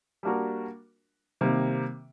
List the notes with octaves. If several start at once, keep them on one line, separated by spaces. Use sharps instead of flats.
G3 A#3 D4 F#4 A#4
C3 D#3 G3 A#3